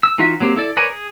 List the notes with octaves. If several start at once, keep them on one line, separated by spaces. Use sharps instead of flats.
E6
E3 D#4 F4 F#4 E5
F#3 A#3 C4 G4
E4 A4 D5
A#4 B4 C#5 D5 G#5
G#4